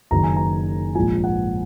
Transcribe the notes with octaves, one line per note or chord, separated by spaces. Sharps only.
F#1 F#2 D#3 A#5
G#5
A#5
A#1 G#2 F3 G#5
F#5